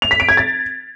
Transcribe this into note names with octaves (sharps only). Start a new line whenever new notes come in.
F7
B6
D7
G#6
A6